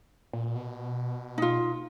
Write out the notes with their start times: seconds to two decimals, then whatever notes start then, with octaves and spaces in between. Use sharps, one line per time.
0.33 A#2
0.55 B2
1.38 D#4 F4